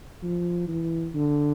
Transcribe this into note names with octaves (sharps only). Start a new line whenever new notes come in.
F3
E3
D3